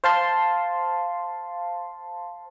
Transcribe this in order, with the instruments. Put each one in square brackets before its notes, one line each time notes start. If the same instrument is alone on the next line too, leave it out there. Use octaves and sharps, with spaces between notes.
[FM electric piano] C5 F5 A5 C6